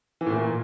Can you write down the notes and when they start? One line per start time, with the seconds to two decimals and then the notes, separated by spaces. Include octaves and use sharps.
0.21 E3
0.26 A2
0.32 A#2